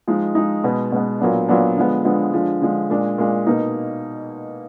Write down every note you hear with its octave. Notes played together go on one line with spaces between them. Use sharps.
F3 G#3 D#4
F3 G#3 D#4
B2 G#3 B3
B2 G#3 B3
A#2 F#3 B3 D4
A#2 F#3 B3 D4
D3 F3 G#3 B3
D3 F3 G#3 B3
D3 F3 G#3
D3 F3 G#3
A#2 G#3 D4
A#2 G#3 D4
B2 A#3 D#4